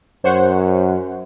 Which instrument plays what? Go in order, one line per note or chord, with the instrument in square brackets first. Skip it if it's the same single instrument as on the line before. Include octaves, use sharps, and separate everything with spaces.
[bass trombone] F#2 [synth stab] C5 C#5 F#5